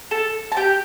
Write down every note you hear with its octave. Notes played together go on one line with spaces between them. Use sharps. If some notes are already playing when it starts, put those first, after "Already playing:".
A4 A5
A5
G4 G5